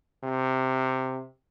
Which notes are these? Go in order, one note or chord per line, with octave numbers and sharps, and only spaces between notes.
C3